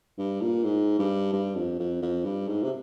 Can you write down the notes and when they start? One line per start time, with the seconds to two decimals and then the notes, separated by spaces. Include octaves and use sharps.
0.18 G2
0.41 A#2
0.64 G#2
0.99 G2
1.32 G2
1.55 F2
1.79 F2
2.02 F2
2.24 G2
2.47 G#2
2.63 C3